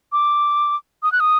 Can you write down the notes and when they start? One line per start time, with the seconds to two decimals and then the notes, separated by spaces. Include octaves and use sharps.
0.12 D6
1.03 D#6
1.12 F#6
1.20 D#6